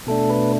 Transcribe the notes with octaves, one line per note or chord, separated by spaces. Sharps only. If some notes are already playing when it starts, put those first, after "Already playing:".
B2 A3 D4 A4
B4